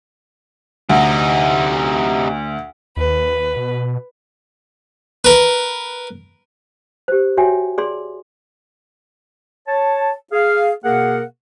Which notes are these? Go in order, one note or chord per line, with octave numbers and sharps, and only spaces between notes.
D2 C3 D#4
D#2 B4
B2
A#4 B4
G4 C5
F#4 C#5 E5 G5 G#5
G#4 D5 C6
C#5 A5
G#4 F5
B2 A#3 G#4 A#4 F5 F#5